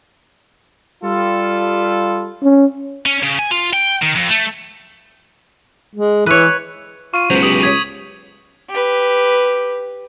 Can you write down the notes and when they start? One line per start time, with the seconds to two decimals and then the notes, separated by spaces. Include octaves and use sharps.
1.04 G3 F4 A4
2.44 C#4
3.06 C#4
3.23 C#3
3.39 G#5
3.51 F4
3.73 G5
4.03 D#3
4.16 F2
4.30 A3
5.96 G#3
6.26 E3 B4 C#5
7.14 F4 C#6 D#7
7.30 C#2 F#3 B3 C5
7.43 G4 D#6 F#7
7.63 G#6 B6
8.70 G4 B4